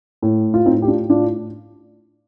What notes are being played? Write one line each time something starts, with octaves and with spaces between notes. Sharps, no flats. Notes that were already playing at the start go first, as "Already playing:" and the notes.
A2
F4
A2 C4 D#4
G4
D4 F4
A2 D4 F4